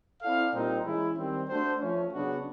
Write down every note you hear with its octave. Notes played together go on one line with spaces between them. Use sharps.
C4 E4 A4 D5 F5
A#2 G3 C4 D#4
E3 G#3 C#4 E4
D#3 G3 C4
A3 D4 F#4 A4 C5
F3 A3 C#4
C#3 F#3 B3 D4 F#4